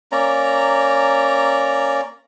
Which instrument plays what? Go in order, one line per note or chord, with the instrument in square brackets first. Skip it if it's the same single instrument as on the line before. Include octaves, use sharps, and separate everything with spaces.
[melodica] A#3 C#4 D5 A#5